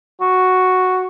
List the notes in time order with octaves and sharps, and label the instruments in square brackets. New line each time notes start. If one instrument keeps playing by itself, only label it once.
[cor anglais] F#4